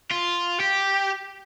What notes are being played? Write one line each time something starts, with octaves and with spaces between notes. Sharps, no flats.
F4
G4